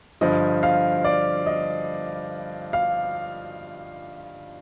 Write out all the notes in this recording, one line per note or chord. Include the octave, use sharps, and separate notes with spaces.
G2 D3 F3 D#5
F5
D5
D#5
F5